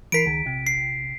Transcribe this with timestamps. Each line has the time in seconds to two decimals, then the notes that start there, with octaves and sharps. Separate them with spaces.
0.12 E3 A#4 B6 C7 D7
0.26 C#2 D#3
0.45 A#1 C3
0.67 C7